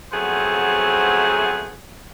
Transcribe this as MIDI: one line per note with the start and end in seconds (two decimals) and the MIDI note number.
0.12 1.79 53
0.12 1.79 54
0.12 1.79 57
0.12 1.79 59
0.12 1.79 60
0.12 1.79 68